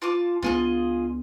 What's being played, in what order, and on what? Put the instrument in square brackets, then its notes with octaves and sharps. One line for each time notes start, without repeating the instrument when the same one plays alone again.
[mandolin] F4 A5 D6
[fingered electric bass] C#2 B3 D4 [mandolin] F4 G#4 D#5